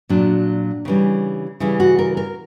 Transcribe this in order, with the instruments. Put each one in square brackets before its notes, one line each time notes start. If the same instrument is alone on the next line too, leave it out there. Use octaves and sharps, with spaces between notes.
[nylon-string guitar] A#2 F#3 D4
C#3 E3 G3
C#3 E3 G3 E4
F#4
A#4
A#4